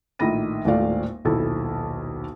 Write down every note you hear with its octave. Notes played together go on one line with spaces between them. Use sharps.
A#1 A2 D#3 B5 A#6 D#7
D#1 G#1 A2 A3 D5 F5
D#1 B1 E4 A4 A5